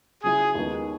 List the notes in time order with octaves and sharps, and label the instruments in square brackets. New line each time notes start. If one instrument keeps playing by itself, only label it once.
[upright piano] C#3 F#3 C#4 E4 [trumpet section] G#4
[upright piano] D#2 D#3 G#3 B3 D#4